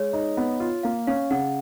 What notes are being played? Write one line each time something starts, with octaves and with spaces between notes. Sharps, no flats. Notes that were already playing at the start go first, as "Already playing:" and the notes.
Already playing: G#3 C#5
D#4
B3
F4
A#3 F5
C#4 F5
C#3 F#5